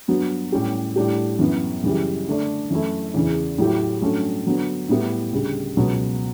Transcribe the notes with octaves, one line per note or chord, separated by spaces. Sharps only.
G2 F#3 B3 F#4
A2 G3 C#4 G4
A2 G3 D4 G4
F#2 E3 B3
F#2 C#3 E3 G3
D3 A3 D4
F#2 E3 A3 E4
E2 C#3 E3
A2 F#3 A3 E4 G4
G2 F#3 A3 C#4
D3 F#3 B3
A2 G3 B3 E4 G4
D2 C#3 G3
C#2 B2 F#3 B3